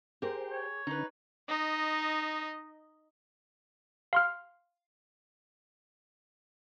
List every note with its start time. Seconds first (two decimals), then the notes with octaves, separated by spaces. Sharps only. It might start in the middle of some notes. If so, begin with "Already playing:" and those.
0.22 G4 G#4 A#4 C5 G5
0.51 C#5
0.87 D3 C#4 D#4 B4
1.49 D#4 D#5
4.13 F5 C6 F6